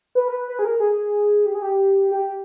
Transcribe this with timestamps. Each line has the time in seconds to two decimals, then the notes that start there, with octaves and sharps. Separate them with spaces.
0.15 B4
0.28 A#4
0.32 B4
0.48 B4
0.59 G#4
0.65 A#4
0.80 G#4
1.46 G4
1.55 G#4
1.62 G4
2.11 G4